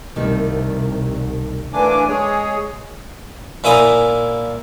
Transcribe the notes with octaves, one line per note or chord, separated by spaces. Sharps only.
C2 D#3 G3 A3
E3 A3 A#3 D4 G#5 D6
G#3 G#4 C#5
A#2 A#3 E4 G#5 D#6